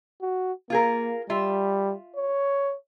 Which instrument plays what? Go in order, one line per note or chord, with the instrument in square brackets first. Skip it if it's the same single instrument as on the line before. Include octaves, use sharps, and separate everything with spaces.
[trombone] F#4
[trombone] A#3 [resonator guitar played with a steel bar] F4 G#4 A#4
[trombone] G3 [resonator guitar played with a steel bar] F4 E5
[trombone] C#5